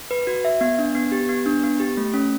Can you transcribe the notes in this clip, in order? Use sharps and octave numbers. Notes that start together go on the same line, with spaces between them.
B4
F#4
E5
B3
D4
B3
G4
B3
D4
B3
G4
A3
C#4